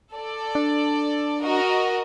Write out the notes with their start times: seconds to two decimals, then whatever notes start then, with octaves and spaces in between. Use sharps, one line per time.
0.14 A4 D5
0.55 D4
1.44 F#4 A#4 D#5